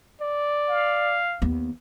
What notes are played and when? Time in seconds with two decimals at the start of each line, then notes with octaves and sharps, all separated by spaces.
0.21 D5
0.70 F5
1.42 D#2 B3